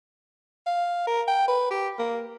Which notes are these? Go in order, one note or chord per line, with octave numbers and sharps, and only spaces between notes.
F5
A#4
G5
B4
G4
A#3